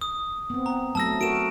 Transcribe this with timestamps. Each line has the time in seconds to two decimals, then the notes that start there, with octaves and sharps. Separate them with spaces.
0.01 D#6
0.50 B3 C4
0.66 A#5
0.95 F#3 A3 A5 E6 A#6
1.21 F#4 A4 A#4 D7 E7